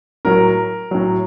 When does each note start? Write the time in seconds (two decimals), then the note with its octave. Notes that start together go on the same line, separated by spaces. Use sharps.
0.25 A2 F#3 A#4
0.91 A2 F#3